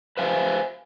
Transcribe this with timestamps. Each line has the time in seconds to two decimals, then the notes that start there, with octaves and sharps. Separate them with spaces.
0.17 B4 C5 F5 G#5